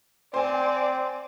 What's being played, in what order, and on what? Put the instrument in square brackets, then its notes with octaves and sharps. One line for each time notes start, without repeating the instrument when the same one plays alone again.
[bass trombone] C4 [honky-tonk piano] C5 G#5 [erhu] D5